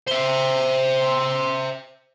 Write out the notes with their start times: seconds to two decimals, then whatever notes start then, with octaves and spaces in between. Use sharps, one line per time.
0.07 C5 E5